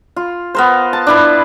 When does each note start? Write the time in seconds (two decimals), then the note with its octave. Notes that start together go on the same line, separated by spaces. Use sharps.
0.16 F4
0.54 B3 A#4 C5
0.93 A5
1.07 D4 E4 B4